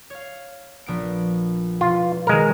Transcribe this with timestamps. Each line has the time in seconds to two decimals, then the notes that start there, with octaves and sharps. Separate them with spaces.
0.10 C#5 F5
0.86 A#1 B3 D7
1.81 E1 F4
2.27 B2 D#3 G#3 A#4